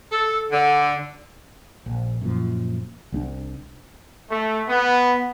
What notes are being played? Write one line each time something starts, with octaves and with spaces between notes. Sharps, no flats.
A4
D3
A#1
F#2 A#2 F3
C2 G#3 D4
A3
B3